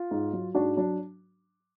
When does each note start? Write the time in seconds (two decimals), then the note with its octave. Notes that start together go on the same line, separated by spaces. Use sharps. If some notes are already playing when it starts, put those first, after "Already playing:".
Already playing: F4
0.11 G#2
0.33 F#3
0.55 G#2 D4 F#4
0.77 F#3 D4